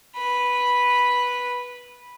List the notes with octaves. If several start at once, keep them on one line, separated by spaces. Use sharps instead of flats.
B4 B5